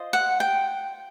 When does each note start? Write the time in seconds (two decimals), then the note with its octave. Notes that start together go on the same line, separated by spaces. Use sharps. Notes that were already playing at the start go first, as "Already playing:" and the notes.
Already playing: F4 C5 D#5
0.13 F#5
0.40 G5